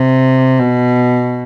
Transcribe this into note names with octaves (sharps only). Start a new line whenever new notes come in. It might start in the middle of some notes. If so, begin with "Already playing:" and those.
Already playing: C3
B2